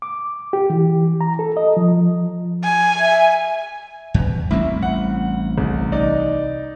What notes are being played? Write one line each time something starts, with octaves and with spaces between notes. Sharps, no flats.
D6
G4
E3
A#5
A4
D#5
F3
G#5
E5
E2
A1 G3 C4 E4
F#5
C2
D#4 D5